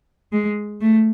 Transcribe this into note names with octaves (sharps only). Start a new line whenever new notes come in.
G#3
A3